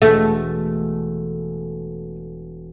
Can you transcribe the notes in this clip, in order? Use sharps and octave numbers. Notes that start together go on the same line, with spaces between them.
E1 A3